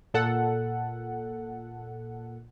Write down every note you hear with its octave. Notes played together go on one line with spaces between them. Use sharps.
A#2 A4 F#5